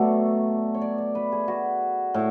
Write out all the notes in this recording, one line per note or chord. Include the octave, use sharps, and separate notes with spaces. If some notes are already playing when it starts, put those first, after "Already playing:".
Already playing: B2 F#3 A3 A4 D5
C#5
D5
D5
B4
G#4
F#4
A2